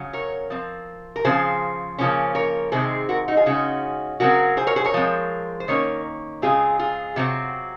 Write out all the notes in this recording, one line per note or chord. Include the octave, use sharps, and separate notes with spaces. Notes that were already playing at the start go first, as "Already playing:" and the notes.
Already playing: C#3 F#3 C#4
A#4 C#5
F3 C4
A#4
C#3 F3 C4 G#4 C5
C#3 F3 A#3 C#4
A#4 C#5
C3 D#3 G#3 C4 G#4 C5
F#4 A#4
D#4 F#4
F4 G#4
C#3 G#3 C#4 D#4 F#4
C#3 F#3 C4 F#4 A#4
G#4 C5
A#4 C#5
G#4 C5
A#4 C#5
F3 G#3 C4
C5
D#3 A#3 C#4 A#4 C#5
C#3 G#3 C4 F4 G#4
F4 G#4
C3 F#3 C4